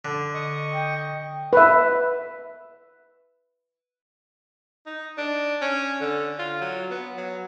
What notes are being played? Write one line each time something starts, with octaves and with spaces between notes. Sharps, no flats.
D3
D#5 C#6
G5
B4 E5
D#4
D4
C#4
D3
F4
F#3
B3
F#3